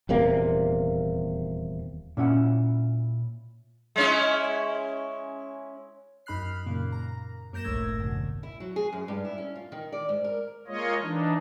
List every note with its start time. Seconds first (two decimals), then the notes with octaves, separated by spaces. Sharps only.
0.09 D#1 E2 C3 A#3
2.17 A#2 C#4 E4 F#5
3.96 G#3 C#4 E4
6.26 F#2 D#4 B5 F6 F#6 C7
6.66 F#2 A#2 C#3 A#3
6.92 A#5
7.52 F#2 A#3 A#4 G6 A#6 E7
7.64 G1 C2 A2 A3 E6 G#6
7.99 F#2 B2 D3
8.43 E4
8.60 F#3
8.76 G#4
8.93 F#2
9.08 G2
9.24 E4
9.38 C#4
9.55 F4
9.72 D#3
9.92 D5
10.09 G#2
10.24 A#4
10.68 G#3 A#3 F4 C#5 D#5
11.02 E3 D4 D#4